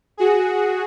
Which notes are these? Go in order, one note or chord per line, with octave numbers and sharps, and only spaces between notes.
F#4 G#4